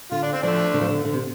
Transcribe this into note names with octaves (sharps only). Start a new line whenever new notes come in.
D3 F4
D4
C4
F3 A3 D4
D3
F3
D3
D3
C3